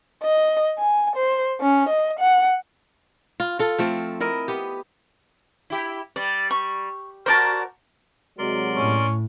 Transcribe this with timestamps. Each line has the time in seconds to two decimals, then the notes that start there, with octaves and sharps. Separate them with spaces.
0.23 D#5
0.78 G#5
1.16 C5
1.61 C#4
1.89 D#5
2.20 F#5
3.40 F4
3.59 F4 A4
3.79 F3 A3 C4
4.20 E4 A#4 D#5
4.48 B3 G4
5.70 E4 G4
6.16 G3 D5
6.51 C#6
7.26 F#4 A#4 C5 D5 A5
8.38 C3 F#3 G#3 A#4 D5 C6
8.76 A2 C#4